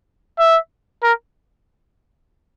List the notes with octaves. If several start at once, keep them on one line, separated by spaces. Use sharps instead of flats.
E5
A#4